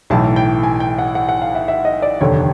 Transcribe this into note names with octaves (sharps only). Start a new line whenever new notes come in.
B1 A2 E3 A5
G5
G#5
G5
F#5
F#5
F#5
F5
E5
E5
D#5
D5
F1 D#2 D3 C#5